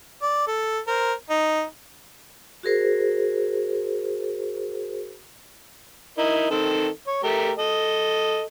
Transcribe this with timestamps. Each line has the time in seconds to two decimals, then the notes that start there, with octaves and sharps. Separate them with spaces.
0.22 D5
0.47 A4
0.87 A#4 C5
1.29 D#4
2.63 F#4 G#4 A#4 C5
6.18 D#4 E4 A#4
6.50 D#3 C4 A4
7.07 C#5
7.23 A3 G4 A#4
7.58 A4 D#5